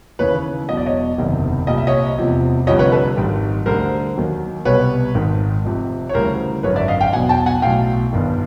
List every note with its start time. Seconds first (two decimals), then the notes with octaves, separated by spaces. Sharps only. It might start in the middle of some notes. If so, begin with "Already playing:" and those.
0.19 D#2 C#3 E3 B4 C#5
0.68 E1 E2 B2 F#3 D#5
0.77 D5
0.86 C#5 D#5
1.18 F#1 E2 C3 D#3
1.67 C2 A#2 G3 D#5
1.78 E5
1.87 C#5 D#5
2.17 F1 E2 C3 F3
2.66 F1 F2 D3 G3 C#5 D#5
2.79 B4 C#5
2.92 A4 B4
3.17 G#1 G#2 D#3 G3
3.66 D2 D3 G3 A#4 C5
4.16 D#2 D#3 F#3
4.65 C2 B2 G3 B4 C#5
5.14 G#1 G#2 D#3
5.64 F1 F2 C3
6.09 C#5
6.14 D2 C#3 E3 G3 A#4 C5
6.63 G#1 F#2 D3 B4 C#5
6.76 D5 E5
6.88 D#5 F5
7.01 F5 G5
7.13 E2 B2 F#3 F#5 G#5
7.29 G5 A5
7.46 F#5 G#5
7.62 B1 A2 F#3 F5 G5
8.13 G1 G2 D#3